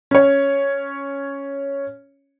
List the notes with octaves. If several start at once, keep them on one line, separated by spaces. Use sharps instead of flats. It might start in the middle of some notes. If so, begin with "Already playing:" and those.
C#4 C#5